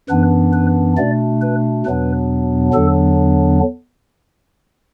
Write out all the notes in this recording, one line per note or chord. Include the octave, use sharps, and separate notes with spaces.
F#2 E3 B3 D4 B4
B4
B2 A3 D4 D5
B4
E2 B2 F#3 B3 D4 B4
E2 D3 F#3 B3 D4 A4